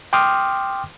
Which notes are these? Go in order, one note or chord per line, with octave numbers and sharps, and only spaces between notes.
G5 C6 D6 D#6 F6